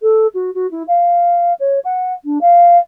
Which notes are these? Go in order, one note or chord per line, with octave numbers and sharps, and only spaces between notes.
A4
F#4
F#4
E4
F5
C#5
F#5
D4
F5